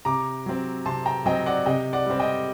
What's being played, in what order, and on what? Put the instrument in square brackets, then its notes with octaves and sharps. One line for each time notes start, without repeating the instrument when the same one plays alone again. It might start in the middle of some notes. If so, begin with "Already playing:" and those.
[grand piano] C3 A#5 D6
F#3 C4
C3 A5 C6
G5 A#5
F#3 C4 D#5 G5
D5 F#5
C3 D#5 G5
D5 F#5
G3 C4
D#5 G5